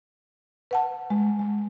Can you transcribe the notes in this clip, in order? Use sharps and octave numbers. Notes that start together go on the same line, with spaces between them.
B4 F#5 A5
G#3
G#3